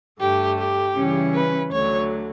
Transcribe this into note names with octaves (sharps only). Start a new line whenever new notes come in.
G2 D3 A3 G4
G4
C#3 E3 G3 C#4 E4
B4
D2 D3 F#3 C#5